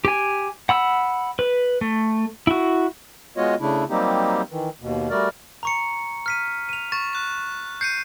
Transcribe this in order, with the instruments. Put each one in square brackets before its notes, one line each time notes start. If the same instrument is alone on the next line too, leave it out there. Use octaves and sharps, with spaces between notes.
[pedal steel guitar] G4 G#5
F#5 B5 E6
B4
A3
E4 F#4
[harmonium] G#3 B3 F4 F#4 C#5 D#5
C#3 A3 D4 E4
F#3 G3 A#3 C4 D#4 G4
D#3 E3
D#2 B2
G3 A3 F#4 A#4 D5
[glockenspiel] A#5 C#6 C#7
F6 B6 D#7
D#7 F7
[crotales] C#6 [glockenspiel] A6
[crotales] C#6 F#6
[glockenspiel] G6 [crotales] C7 C#7 D#7